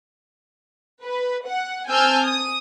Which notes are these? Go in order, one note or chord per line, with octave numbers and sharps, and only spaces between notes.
B4
F#5
C4 G#5 A5 E6 F6 G6
D#6